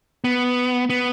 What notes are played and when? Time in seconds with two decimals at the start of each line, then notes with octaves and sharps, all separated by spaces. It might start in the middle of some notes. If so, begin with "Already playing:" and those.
0.24 B3
0.90 B3